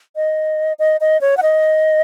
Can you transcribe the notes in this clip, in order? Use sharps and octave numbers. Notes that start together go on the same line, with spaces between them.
D#5
D#5
D#5
C#5
F#5
D#5